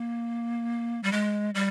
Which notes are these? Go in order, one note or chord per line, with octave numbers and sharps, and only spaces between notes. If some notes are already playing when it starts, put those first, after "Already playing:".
Already playing: A#3
G3
G#3
G3